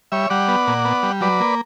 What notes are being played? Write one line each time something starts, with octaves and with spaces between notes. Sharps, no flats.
G3 C#5 E5
G3 D5 F#5
B3
A#2
B3
G3
F#3 B4 D5
A#3